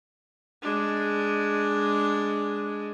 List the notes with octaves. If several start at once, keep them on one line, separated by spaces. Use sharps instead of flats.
G#3 D4